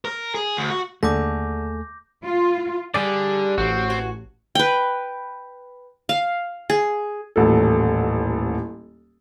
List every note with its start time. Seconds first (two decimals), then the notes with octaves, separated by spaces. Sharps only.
0.05 A#4
0.35 G#4
0.57 D2
0.70 F#4
1.03 D#2 D3 A3 A#3 G#4 D6 G6 A#6
2.24 F4
2.94 D3 G3 G4 G#4 D5
3.58 A1 C4 F#4
3.90 G#5
4.55 B4 G5
6.09 F5
6.70 G#4
7.36 D#1 A1 A4